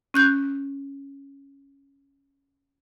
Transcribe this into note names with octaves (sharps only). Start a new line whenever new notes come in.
C#4 F#6 G6